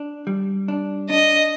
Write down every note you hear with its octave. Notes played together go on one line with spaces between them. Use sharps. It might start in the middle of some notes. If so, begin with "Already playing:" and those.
Already playing: D4
G3
D4
D4 D#5